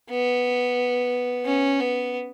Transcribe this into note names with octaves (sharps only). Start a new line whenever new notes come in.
B3
C#4
B3